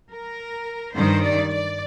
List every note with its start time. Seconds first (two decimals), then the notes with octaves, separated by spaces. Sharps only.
0.11 A#4
0.96 G2 D#3 G3 C5
1.24 D5
1.52 D5